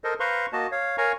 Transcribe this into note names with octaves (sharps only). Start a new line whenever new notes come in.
A4 A#4 C5 D#5
B4 C5 F5 A#5 C6 C#6
A#3 F#4 D#5 A5
C#5 F5
A#4 C#5 F5 G#5 A#5 C#6